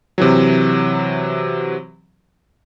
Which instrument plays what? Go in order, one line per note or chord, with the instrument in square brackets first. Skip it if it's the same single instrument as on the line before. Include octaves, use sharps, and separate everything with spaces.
[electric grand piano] C3 E3 F#3